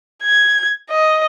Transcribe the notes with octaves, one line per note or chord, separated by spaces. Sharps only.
G#6
D#5